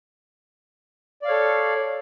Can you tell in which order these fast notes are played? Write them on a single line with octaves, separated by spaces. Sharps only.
D5 F5 C#5 A4